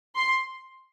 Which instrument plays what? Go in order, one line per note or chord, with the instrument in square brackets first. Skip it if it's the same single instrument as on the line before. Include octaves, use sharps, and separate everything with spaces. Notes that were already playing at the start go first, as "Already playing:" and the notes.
[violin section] C6